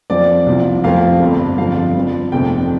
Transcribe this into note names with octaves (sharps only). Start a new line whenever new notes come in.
F2 F3 C4 D5
C2 C3 F3
F2 F3 A3 C4 F5
G1 G2 G3 C4
G1 F2 F3 C4 F5
G2 F3 C4
F1 F2 C3 A3 C4 G5